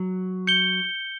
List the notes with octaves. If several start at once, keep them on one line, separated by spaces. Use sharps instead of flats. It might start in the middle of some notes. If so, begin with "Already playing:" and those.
Already playing: F#3
G6 C#7 G7